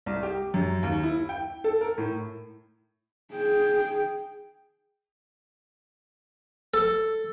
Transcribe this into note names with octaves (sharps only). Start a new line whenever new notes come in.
C2
G4
F#2
D#2
E4
G5
A4
A#4
A2
G#4 G5
A4